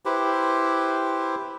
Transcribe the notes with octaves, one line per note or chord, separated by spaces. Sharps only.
E4 G4 B4 C5